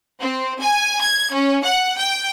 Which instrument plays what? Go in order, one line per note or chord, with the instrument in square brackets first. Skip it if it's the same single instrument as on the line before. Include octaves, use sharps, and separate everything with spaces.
[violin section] C4
G#5
G#6
C#4
F#5
G5